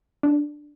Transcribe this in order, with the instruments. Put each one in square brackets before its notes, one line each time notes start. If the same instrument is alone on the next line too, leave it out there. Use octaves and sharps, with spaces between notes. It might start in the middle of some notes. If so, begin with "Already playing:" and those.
[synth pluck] D4